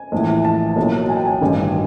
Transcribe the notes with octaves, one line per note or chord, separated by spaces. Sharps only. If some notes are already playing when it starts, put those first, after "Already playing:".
Already playing: G#5
A#1 A2 E3
A5
B1 A#2 F#3
G#5
G5
G#5
A1 G2 D#3